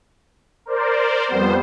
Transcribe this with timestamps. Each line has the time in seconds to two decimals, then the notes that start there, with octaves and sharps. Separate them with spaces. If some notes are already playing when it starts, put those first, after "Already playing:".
0.66 A#4 C5 D5
1.27 F2 G3 B3 C5